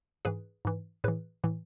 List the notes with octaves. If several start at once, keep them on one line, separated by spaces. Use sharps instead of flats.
G#2 E3 G#4 B4
G#2 E3
A2 E3 G#4 B4
A2 E3